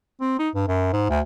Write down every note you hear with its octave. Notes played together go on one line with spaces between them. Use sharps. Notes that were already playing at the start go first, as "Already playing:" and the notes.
C4
D#4
G2
F#2
G#2
D2